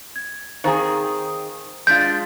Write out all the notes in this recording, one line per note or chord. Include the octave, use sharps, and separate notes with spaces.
G#6
D#3 C4 G#4 C5 F5 A#5
G#3 D4 F4 G6 A6 B6 D7